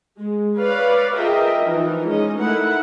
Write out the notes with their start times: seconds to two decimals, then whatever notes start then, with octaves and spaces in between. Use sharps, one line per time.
0.18 G#3
0.58 B4 C#5 D5 F5
1.16 F4 G#4 A#4 D#5 E5 G5
1.60 E3 F3 D#4 A#4
2.05 G#3 C#4 D#4 D#5
2.37 A3 D#4 E4 A#4 F#5